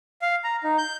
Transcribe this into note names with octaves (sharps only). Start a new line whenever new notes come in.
F5
A#5
D#4
G6